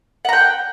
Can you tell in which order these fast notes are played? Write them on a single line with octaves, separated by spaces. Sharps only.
F#5 A#5 G5